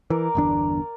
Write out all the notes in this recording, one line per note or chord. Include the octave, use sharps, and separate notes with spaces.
E3 A#4 D5
G1 E2 D4